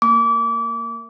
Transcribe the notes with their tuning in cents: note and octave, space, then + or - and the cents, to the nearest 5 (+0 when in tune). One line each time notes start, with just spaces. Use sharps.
A#3 -10 D6 -30